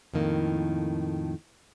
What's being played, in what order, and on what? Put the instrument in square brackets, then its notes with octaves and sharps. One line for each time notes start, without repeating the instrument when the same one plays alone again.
[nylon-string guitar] F2 A2 D#3 A#3